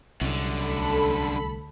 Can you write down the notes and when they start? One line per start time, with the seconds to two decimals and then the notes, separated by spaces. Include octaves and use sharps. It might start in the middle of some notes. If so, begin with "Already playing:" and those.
0.21 C2 F#2 D3
0.62 D2 A4 B5